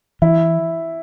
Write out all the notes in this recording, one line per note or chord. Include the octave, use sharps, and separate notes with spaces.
E3 E4